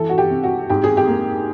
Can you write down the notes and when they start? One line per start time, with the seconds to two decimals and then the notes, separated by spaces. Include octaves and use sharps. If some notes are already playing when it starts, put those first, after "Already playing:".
Already playing: E3 A4
0.09 F#4
0.18 G4
0.30 C3
0.43 F#4
0.70 G#2 G4
0.84 G#4
0.97 G4
1.08 A#3